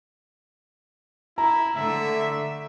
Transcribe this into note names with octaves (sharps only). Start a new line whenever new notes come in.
E4 A#5
D3 A3 E5